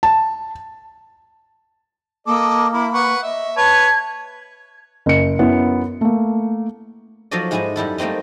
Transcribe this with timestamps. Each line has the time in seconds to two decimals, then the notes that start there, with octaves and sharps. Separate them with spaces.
0.03 A5
2.27 A#3 A4 D#5 D6
2.74 E4 B5
2.94 B4 F#5 C#6
3.23 D#5 E5
3.57 B4 C#5 A5 G#6
5.06 F#1 C#7
5.39 F#2 B3 E4
6.01 A3 A#3
7.31 F3 F#3 F#4 A4 D5 D#5
7.51 G#2 G#3 E4 G#4 A4 G#5
7.76 F#2 G3 E4 A4
7.98 G3 A3 A#3 C4 D#4